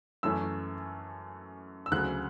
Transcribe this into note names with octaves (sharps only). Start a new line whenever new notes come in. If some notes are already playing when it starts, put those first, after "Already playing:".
F#2 E3 A3 C#4 E6
E6
D2 C#3 F#3 F#6